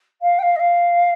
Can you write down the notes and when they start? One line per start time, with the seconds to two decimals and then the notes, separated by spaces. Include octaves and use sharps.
0.21 F5
0.38 G5
0.42 F5
0.55 D#5
0.59 F5